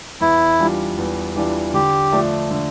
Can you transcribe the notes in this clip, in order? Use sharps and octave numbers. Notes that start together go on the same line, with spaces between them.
E2 E4
E3 G3 D4 F4
E2
E3 G3 D4 F4
D3 G4
F3 A3 D4
D3